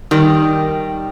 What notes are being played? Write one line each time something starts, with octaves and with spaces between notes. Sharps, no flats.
D#3 G3